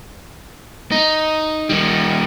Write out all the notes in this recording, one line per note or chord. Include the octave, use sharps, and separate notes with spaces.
D#4
D#3 G3